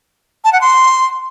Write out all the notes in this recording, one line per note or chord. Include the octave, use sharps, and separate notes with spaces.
A5
F#5
C6